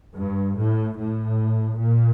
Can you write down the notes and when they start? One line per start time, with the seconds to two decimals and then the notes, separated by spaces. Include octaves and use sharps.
0.16 G2
0.57 A2
0.97 A2
1.78 A#2